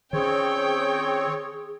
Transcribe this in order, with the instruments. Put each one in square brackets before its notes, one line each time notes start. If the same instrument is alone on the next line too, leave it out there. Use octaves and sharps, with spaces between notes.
[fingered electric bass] D#3 C#4 [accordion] C4 C#5 [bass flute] G#4 [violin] G5